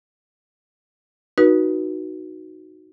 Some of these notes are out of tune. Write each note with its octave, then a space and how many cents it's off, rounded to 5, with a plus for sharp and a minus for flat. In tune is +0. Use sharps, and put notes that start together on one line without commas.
D#4 +0 F#4 +0 B4 -30